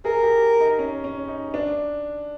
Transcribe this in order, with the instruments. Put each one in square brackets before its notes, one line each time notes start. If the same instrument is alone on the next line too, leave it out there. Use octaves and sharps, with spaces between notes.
[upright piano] G#4 [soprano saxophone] A#4
[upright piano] G4
D#4
C#4
C#4
D#4
D4